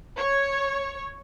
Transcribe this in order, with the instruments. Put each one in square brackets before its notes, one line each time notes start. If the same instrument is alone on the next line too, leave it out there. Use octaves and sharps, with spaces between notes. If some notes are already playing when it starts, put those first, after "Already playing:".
[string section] C#5